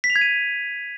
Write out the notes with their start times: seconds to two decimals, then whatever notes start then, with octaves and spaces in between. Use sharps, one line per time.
0.04 B6
0.10 F7
0.16 G#6
0.21 D#7